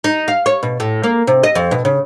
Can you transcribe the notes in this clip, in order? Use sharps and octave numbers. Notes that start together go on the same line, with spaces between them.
D#4
F5
C#5
B2
A2
A#3
C3
D#5
F2
B2
C#3